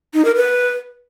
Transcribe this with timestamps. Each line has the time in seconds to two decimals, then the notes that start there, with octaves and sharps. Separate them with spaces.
0.14 D#4
0.25 A#4
0.36 B4